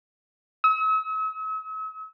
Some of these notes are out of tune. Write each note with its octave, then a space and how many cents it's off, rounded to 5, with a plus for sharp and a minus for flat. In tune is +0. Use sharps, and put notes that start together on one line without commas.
E6 -45